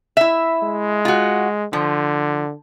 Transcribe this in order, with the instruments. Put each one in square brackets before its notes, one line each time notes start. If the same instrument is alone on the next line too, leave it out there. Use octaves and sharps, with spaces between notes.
[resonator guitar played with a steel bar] E4 E5
[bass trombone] G#3
[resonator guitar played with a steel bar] F4 F#4
[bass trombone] D3 [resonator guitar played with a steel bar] F3